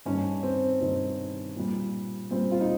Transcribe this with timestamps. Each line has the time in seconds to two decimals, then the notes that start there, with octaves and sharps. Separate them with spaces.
0.06 G2 D#3 G3 C#4
0.43 C4
0.80 G2 D#3 G3
1.56 A#2 G3
2.30 A#2 G3 C4
2.52 F4
2.60 D#4